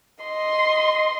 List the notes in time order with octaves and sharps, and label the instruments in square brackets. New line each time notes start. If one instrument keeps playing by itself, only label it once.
[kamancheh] D#5 C6